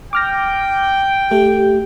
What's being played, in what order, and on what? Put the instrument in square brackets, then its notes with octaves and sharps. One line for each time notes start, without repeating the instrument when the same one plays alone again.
[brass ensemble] G5 [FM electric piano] D6 F6 A#6
[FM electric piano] A3 [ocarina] G4